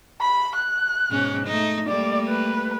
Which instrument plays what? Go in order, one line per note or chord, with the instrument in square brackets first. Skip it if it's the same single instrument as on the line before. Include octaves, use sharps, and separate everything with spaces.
[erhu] B5
F#6
[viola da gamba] G#2 B2 C#4
A3 D#4
[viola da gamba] G3 A3 A#3 [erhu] D5
[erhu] B4